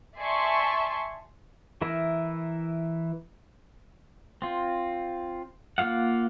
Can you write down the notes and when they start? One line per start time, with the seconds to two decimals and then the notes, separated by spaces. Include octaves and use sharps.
0.18 D5 E5 G#5 A5 C6 C#6
1.81 E3 E4 A#4 E5
4.42 C4 F4
5.78 A#3 F4 F5 F#5